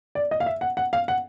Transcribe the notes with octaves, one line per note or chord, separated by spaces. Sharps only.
D5
D#5
F5
E5
F#5
F#5
F5
F#5